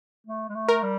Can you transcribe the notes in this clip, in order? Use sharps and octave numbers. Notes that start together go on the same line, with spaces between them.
A3
G#3
A3
A#4
G3